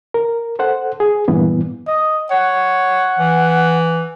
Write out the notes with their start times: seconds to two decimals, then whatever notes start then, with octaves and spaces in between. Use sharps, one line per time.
0.14 A#4
0.59 A4 C5 F#5
1.00 G#4
1.28 G2 A#2 E3 B3
1.88 D#5
2.31 C#5 F#5
3.19 E3